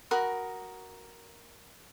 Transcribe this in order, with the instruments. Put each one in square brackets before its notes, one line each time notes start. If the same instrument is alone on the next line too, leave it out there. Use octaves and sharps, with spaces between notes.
[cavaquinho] F#4 A#4 B5 D#6